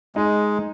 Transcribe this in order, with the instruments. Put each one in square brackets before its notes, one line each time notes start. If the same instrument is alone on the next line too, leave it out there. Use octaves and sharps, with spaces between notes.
[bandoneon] G#3 [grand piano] D#4